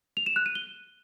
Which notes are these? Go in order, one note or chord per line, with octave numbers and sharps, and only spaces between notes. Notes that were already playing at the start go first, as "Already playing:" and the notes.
F7
E7
F#6
D#7
G7